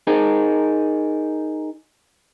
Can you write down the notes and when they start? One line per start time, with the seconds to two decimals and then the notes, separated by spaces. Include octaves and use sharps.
0.07 D#4 G#4 A#4